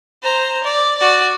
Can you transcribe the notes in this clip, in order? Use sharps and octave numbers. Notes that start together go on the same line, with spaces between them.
C5 A#5
D5
F#4 D5